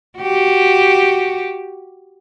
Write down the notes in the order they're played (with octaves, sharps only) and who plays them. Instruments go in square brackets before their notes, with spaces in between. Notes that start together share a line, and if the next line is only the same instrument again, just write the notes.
[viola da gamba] F#4 G4